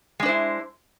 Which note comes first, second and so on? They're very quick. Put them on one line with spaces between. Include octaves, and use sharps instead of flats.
G#3 D4 C5 E4